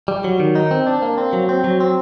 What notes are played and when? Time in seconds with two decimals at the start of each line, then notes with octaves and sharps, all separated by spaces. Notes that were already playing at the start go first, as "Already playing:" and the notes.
0.08 G3
0.24 F#3
0.40 D#3
0.55 D#4
0.71 C4
0.87 D4
1.02 A#3
1.18 C4
1.33 F#3
1.49 C4
1.64 F#3
1.80 C4